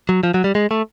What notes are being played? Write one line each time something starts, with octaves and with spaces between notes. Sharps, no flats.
F#3
F3
F#3
G3
G#3
A3